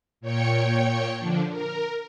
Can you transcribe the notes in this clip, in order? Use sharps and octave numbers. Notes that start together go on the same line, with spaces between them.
A#2 C#5 G5 C#7
D3 F3 D4
A#4